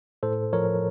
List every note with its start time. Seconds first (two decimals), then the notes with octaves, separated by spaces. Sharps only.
0.23 A2 A4 C5
0.53 F3 A#4 C#5